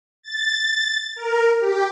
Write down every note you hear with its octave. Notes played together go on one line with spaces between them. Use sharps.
A6
A#4
G4